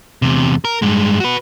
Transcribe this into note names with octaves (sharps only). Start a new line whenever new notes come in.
E2 C3
A#4
G2 G#3
F#4 B4